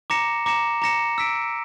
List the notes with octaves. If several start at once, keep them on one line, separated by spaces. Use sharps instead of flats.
A#5 D6 A#6 C#7 E7
A#5 D6 A#6 C#7 E7
A#5 D6 A#6 C#7 E7
E6 B6 D7